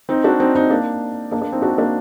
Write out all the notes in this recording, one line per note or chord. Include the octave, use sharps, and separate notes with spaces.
C4 D#4
D4 F#4
C4 D#4
C4 D#4
A#3 D4
A#3 D4
A#3 D4
C4 D#4
D4 F#4
A#3 D4